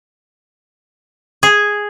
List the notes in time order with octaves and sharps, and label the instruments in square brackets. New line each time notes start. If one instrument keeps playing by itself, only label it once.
[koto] G#4